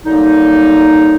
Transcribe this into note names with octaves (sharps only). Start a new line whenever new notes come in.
F#2 D3 G3 A#3 D#4